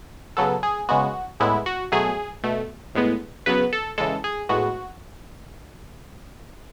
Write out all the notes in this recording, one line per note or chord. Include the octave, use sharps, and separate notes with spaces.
C#3 F#3 B3 A4
G#4
C#3 G#3 B3 F#4
A2 G#3 B3 E4
F#4
B2 F#3 A3 G#4
B2 A3
A2 G#3 B3
C#3 F#3 B3 B4
A4
C#3 E3 G#3 A4
G#4
A2 G#3 B3 F#4